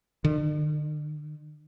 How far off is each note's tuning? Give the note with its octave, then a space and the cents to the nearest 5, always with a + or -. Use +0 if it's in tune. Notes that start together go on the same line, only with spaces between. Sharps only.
D3 +45